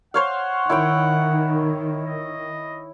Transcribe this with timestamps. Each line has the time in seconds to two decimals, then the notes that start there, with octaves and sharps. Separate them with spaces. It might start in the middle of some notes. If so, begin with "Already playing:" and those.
0.14 C5 C#5 F5 F#5
0.70 D#3 E4 C#5 G5
2.04 D#5